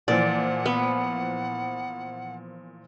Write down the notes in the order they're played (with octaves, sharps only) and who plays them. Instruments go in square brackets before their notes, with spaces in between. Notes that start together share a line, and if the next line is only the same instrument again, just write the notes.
[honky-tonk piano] A#2 E3 F3 [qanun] D5 [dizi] F#5
[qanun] B3